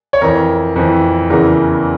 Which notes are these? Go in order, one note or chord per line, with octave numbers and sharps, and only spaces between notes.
C#5
F2 E3 A#4
F2 E3
E2 C#3 E3 A#4